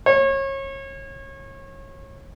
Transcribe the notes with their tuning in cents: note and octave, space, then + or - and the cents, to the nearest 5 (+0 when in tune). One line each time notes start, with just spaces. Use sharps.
C#5 -30